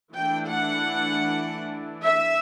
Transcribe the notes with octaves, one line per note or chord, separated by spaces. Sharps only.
E3 A3 D4 G5
F#5
E5